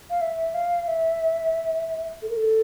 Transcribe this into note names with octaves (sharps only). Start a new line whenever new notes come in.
F5
E5
F5
E5
A4
A#4
A4